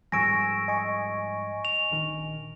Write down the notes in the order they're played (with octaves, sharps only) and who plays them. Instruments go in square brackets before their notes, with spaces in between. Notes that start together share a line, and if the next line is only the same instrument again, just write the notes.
[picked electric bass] G#2 F3 G3 [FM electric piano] G#5 C#6 E6 [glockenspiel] A#6 D7
[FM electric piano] D#5 G#5 C#6
[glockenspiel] F7
[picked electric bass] A#1 D#3